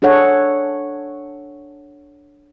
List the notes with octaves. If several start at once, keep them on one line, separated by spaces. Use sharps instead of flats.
D4 G#4 A4 C#5 F#5